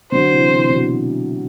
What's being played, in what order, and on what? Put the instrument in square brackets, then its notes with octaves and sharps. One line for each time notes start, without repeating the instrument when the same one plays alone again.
[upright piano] D3 F#3 [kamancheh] C5
[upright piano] C3 E3
C3 E3
B2 D3